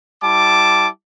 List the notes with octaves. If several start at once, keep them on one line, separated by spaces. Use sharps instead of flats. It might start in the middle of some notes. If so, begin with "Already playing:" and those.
G3 E4 A5 D6